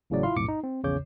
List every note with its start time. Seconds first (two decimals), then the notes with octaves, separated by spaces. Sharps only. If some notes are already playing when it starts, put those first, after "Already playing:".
0.10 A1 A2 C#3 E3 F#3 D5
0.23 E4 F4 F5 C6
0.36 B1 F2 A2 D6 C#7
0.48 D#4
0.64 C4
0.84 A#1 E2 C#3 C#5 D6 G6